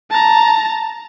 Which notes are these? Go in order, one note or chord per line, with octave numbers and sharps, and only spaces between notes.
A5 A#5